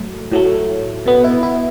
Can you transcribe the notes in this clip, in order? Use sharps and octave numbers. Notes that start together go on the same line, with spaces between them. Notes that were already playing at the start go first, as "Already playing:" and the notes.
Already playing: A2 F#3 A3
A2 F#3 A3
B2 B3
E4
E4